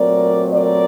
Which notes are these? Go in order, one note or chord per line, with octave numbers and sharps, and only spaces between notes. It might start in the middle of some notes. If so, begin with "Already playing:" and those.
Already playing: A#2 F#3 A3 C4 A#4 D5
A#4 D5